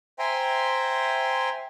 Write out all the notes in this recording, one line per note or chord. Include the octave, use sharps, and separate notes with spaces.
C5 E5 G5 G#5 A#5 C6